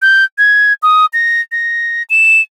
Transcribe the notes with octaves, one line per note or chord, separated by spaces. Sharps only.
G6
G#6
D#6
A#6
A#6
E7